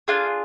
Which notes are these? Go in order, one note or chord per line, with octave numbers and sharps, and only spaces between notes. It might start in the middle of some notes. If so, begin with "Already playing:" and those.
D4 F4 G#4 F5